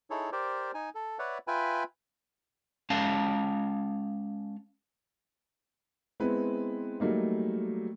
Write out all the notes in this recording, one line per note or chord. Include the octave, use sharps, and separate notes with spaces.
D#4 E4 G#4 A4 C#5
G4 A#4 C5 D5
D#4 G#5
A4
B4 C#5 D5 E5 F#5
F4 B4 E5 G5 G#5 B5
G#3 C#4 F5 A5
G#3 B3 C4 E4 B4
F#3 G3 A3 A#3 D#4